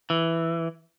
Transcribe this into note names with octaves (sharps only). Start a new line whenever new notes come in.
E3